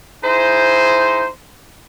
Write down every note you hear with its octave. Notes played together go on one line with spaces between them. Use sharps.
D#4 E4 G#4 C5